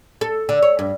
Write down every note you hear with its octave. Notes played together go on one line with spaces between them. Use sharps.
A4
D3
C#5
G2